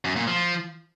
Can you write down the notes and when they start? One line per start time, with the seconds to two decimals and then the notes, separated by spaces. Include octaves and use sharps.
0.05 F#2
0.16 A#2
0.27 F3